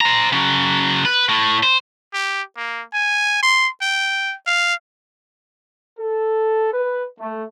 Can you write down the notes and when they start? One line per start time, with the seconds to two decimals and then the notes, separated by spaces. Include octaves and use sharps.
0.01 C5 A#5
0.32 C#3 F#3
1.05 B4
1.29 A2
1.63 C5
2.14 G4
2.57 A#3
2.94 G#5
3.43 C6
3.82 G5
4.47 F5
5.99 A4
6.73 B4
7.20 A3